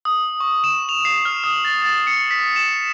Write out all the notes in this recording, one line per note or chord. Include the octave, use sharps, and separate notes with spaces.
D#6
C#6
E7
F7
C7
F6
D#6
A6
A6
C#7
B6
E7